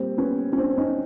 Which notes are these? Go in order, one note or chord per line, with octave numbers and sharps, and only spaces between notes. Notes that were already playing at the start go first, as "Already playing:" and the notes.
Already playing: A#2 G3 A#3 C4
B3 C#4
C#4
C4 D4
D4
C#4 D#4